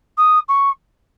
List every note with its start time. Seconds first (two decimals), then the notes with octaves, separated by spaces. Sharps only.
0.18 D#6
0.49 C#6